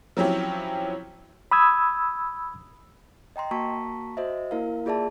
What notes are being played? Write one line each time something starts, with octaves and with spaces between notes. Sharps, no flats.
F3 F#3 C4 C#4 E4 G4
B5 D#6 E6 G#6
D#5 G5 A#5 C6
A#3 F#4 A5 A#5 C#6 B6
F#4 C5 D#5 E5
A#3 E4 A#4 F5
A#3 F4 G#4 D5 E5 A5